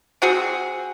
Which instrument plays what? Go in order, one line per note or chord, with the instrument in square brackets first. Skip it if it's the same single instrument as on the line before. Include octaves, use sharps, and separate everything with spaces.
[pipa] C4 F#4 G#4